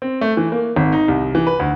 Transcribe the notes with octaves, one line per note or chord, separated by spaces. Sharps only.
C4
A3
E3
A#3
G#1
D#4
C2
E3
B4
D2